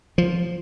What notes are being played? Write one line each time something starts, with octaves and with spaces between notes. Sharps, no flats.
F3